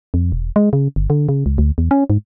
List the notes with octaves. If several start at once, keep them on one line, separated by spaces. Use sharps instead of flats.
F2
E1
G#3
C#3
G1
D3
C#3
C#2
D2
E2
C#4
G#2